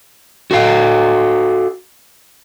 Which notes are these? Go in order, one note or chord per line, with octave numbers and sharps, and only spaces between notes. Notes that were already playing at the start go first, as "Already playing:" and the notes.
F#4 A4 F5